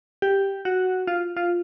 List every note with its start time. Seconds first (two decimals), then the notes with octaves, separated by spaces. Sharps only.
0.22 G4
0.65 F#4
1.07 F4
1.37 F4